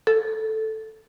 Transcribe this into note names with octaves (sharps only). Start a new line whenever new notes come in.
A4